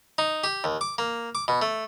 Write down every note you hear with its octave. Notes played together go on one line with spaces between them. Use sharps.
D#4
G4
D#2
D6
A#3
D6
B2
A3